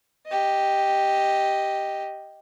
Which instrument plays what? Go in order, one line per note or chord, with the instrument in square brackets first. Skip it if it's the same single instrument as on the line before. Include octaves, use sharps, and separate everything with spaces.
[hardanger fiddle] G4 D#5